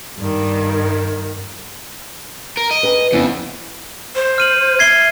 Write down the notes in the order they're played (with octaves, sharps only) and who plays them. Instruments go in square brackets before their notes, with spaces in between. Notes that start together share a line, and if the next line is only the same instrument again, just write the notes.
[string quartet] G2 D#3
[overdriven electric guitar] A#4
D#5
[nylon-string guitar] G#4 B4
[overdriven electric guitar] F2 [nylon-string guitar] C#3 B3 E4
[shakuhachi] C5
[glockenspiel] F6 D#7 F#7
[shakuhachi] E5 [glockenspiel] G#6 C7 G7